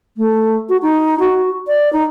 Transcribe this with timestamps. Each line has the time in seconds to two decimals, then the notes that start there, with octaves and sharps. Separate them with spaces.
0.17 A3
0.69 F#4
0.82 D#4
1.19 F#4
1.67 D5
1.92 D#4